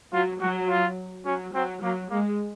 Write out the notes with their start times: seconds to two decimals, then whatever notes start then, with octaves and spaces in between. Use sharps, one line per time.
0.13 F#3 F4
0.40 F#3 F#4
0.69 F4
1.25 F#3 C#4
1.54 F#3 C4
1.82 F#3 A#3
2.11 G#3 A#3